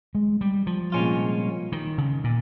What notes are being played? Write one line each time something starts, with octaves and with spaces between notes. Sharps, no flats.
G#3
G3
F3
C2 A#2 G#3 C#4 F4
D#3
C#3
A#2